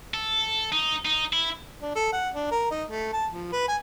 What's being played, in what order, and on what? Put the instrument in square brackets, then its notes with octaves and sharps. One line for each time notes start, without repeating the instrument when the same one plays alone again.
[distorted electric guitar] A4
D#4
D#4
E4
[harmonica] D4
A4
F#5
D4
A#4
D#4
A3
A5
F3
B4
G#5